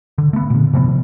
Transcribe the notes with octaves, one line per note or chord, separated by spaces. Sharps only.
D3
A3 B3
A#2 D3
C3 F3 A3 B3